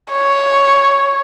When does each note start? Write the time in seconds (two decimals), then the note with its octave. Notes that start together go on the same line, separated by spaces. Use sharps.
0.12 C#5